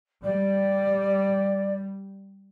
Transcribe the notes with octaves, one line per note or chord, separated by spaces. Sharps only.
G3 D5